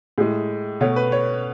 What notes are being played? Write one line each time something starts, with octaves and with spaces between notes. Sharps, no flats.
A2 G#3 G#4
B2 A3 C#5
B4
C#5